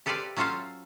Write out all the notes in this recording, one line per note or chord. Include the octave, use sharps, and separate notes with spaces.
G4 A4 B4 C5 D5 F5
F#3 C#4 F4 A4 C5 F5